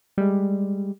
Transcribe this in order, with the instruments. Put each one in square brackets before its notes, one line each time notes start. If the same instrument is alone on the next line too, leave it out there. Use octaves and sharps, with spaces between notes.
[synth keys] G3 G#3